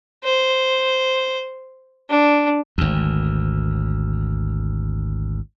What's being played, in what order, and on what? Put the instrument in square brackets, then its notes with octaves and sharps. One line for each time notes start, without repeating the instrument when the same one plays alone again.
[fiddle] C5
D4
[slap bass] G#1 D2